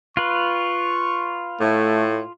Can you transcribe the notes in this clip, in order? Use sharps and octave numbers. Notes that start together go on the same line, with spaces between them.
F4 B4 C#6
A2 A3